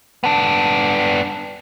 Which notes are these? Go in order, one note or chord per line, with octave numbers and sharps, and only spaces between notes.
B3 D4